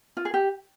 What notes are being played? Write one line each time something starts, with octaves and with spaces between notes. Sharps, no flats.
F4
G#4
G4